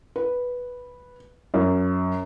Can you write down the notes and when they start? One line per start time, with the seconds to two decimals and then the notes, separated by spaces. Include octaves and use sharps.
0.16 B4
1.54 F#2